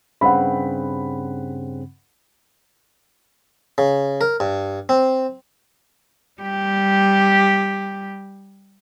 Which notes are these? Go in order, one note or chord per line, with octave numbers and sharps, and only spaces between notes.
G2 C#3 C4 F#5 B5
C#3
A#4
G2
C4
G3 G4